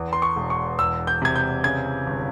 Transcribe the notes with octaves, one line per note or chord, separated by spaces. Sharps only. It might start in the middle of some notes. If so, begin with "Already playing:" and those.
Already playing: E2
C6
C#6
E1
C#6
E2 E6
G6
C3 G#6
G6
C#3 G#6
G1